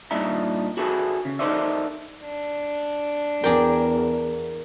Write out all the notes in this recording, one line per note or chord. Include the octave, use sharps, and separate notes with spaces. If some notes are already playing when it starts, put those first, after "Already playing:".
G2 A#2 D4 D#4 E5 A#5
F#4 G#4 A4 B4 E5 G#5
C#3
D#4 A4 A#4 C5 D5 E5
D4
E2 G#4 A#4 D5 G5